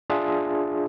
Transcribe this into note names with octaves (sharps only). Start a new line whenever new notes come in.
D4 F4 G#4 E5